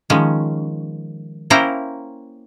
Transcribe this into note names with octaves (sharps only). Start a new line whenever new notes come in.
D#3 F3 G#3 C#4
A#3 C#4 E4 C5 G5 A#5